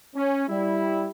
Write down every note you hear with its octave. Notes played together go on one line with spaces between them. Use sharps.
C#4
G3 E4